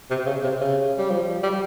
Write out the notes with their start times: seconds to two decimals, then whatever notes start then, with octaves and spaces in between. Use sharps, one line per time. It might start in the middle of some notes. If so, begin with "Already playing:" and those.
0.10 C3
0.26 C#3
0.43 C3
0.61 C#3
0.98 G3
1.10 F3
1.43 G3